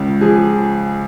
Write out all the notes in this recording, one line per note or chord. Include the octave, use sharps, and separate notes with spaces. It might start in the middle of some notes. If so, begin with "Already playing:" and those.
Already playing: C#2 C#3
F3 G#4